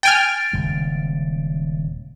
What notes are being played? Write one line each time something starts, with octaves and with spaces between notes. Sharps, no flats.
G5 G#5 F6 A6 D7
D#1 C#3 G#3